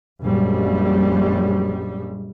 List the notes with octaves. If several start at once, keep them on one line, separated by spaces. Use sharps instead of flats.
A#1 F#2 G3 G#3